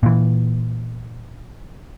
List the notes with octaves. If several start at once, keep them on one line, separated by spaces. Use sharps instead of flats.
A#2 E3